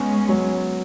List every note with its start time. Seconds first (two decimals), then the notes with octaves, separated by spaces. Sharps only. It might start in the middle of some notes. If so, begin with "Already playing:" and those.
Already playing: G#3 B3 C#4
0.29 F#3